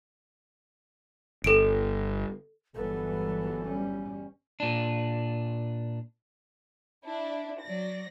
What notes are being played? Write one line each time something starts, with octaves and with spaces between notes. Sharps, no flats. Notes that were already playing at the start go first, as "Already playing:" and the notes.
G1 A4 D7
G1 E3 F#3 B3 A4
G3 C#4
A#2 D4
D4 E4
F#3 D5 A#6